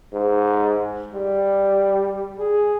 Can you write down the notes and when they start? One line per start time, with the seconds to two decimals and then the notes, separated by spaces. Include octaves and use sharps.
0.13 G#2
1.14 G3
2.39 G#4